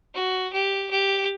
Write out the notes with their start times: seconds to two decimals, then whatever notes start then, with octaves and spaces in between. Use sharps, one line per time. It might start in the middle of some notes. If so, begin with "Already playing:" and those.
0.15 F#4
0.53 G4
0.91 G4